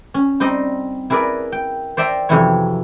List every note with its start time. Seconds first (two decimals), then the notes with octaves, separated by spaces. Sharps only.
0.14 C#4
0.40 G3 C4 D#4 D#5
1.10 E4 G#4 A#4 B4 D5
1.52 G5
1.97 C5 D5 E5 G5 A#5
2.29 F2 C3 E3 F#3 E4 C#5